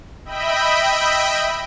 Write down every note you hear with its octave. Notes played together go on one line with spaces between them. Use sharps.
D#5 E5 G5 B5